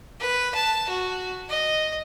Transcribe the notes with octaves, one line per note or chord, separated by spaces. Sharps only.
B4
A5
F#4
D#5